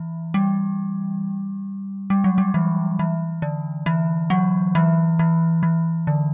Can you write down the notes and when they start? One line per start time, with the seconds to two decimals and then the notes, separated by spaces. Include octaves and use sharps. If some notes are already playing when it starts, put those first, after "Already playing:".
Already playing: E3
0.34 G3
2.10 G3
2.24 F#3
2.38 G3
2.54 E3
2.99 E3
3.42 D3
3.86 E3
4.30 F#3
4.75 E3
5.19 E3
5.63 E3
6.07 D3